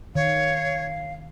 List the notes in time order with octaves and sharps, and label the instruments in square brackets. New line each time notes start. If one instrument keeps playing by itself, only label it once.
[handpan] D#3 [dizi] C#5 [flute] F5